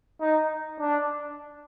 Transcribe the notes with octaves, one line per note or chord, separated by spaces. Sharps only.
D#4
D4